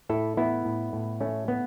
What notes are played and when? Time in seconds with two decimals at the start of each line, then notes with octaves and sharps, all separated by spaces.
0.09 A2 E4 A4
0.37 A3 B3 E4
0.65 A2
0.93 A2
1.21 A3 C#4
1.48 A3 B3